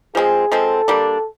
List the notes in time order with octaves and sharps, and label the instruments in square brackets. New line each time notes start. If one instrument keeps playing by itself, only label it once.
[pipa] F3 G#3 C4 [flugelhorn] G#4
[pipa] F3 G#3 C4 [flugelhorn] A4
[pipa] G3 A#3 D4